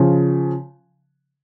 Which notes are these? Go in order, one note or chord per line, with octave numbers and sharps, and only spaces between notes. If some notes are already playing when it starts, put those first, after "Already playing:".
Already playing: C#3 F3